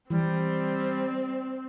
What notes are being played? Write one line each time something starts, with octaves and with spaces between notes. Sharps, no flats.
E3 G3 C4